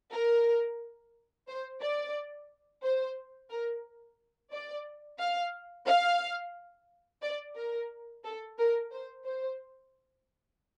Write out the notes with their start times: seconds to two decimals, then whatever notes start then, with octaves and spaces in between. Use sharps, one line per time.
0.12 A#4
1.48 C5
1.80 D5
2.83 C5
3.50 A#4
4.52 D5
5.19 F5
5.86 F5
7.22 D5
7.56 A#4
8.24 A4
8.58 A#4
8.91 C5
9.25 C5